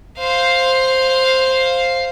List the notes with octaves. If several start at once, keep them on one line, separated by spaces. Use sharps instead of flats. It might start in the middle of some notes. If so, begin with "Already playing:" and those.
C5 F5